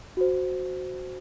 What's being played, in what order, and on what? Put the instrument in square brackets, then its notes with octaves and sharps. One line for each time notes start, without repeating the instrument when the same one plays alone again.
[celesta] F#4 C5